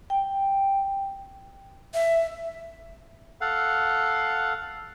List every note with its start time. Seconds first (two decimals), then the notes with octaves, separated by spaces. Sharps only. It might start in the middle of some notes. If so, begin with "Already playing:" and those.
0.10 G5
1.94 E5
3.41 A4 F5 F#5